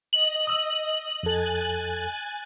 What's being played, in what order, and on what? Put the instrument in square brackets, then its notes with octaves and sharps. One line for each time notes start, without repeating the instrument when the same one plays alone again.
[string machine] D#5 [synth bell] F#7
[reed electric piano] D#6 E6
[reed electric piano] F2 A4 [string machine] G#5 F#6 A6